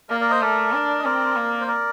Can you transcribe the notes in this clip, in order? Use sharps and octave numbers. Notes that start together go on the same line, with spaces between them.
A#3 A#4 D5
A#4 D5
C5 D#5
A3 A#4 D5
D4
D#5
C4 A#4 D5
A#3
C5
A#4 D5